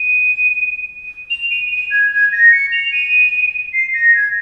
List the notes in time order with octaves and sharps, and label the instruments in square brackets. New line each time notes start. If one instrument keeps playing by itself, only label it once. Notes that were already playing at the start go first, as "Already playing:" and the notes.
Already playing: [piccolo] D#7
F7
D#7
D#7
G#6
G#6
A#6
C#7
F7
D#7
C7
A#6
G#6